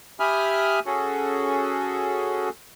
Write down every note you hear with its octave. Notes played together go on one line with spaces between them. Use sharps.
G4 E5 G#5 B5 D#6 F6
C#4 F#4 G#4 A4